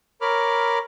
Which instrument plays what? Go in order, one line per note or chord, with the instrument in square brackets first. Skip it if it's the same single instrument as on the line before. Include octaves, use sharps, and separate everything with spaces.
[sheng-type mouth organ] A#4 C#5 B5 D6 F6